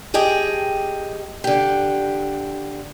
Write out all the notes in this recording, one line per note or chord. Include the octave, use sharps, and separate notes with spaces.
G4 G#4 D#5 G5 A5
D3 G4